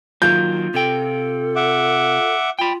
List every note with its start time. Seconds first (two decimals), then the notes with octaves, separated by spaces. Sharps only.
0.22 D#3 F#3 A#3 F4 G6
0.74 C3 A4 G5
1.56 E5 F#5 D6
2.59 F4 G5 B5